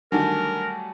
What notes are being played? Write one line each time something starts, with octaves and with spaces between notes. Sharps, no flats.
D3 D#3 F#3 G3 A3 A#4 G#5 A5